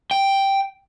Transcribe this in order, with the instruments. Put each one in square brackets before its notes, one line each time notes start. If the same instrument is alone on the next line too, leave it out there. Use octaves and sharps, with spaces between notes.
[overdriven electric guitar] G5